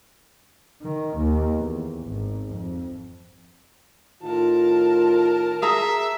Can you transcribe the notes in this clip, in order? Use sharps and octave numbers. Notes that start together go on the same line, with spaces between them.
D#3
D#2
E2
G#1
F2
A2 D#3 F4 A#4 A5
G#4 E5 A#5